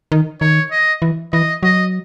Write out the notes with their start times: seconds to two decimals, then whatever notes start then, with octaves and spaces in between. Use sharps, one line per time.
0.12 D#3
0.41 D#3 C#5
0.71 D#5
1.02 E3
1.33 E3 D#5
1.63 F#3 D#5